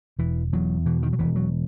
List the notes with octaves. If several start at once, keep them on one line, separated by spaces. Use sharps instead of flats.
E1 E3
E2 F#3
B2 E3
D#3
F#3
E1 E3
F#3